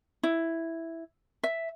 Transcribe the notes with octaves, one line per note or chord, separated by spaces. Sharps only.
E4
E5